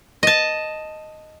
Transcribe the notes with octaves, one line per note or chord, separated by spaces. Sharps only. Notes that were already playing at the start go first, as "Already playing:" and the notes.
D#5 A5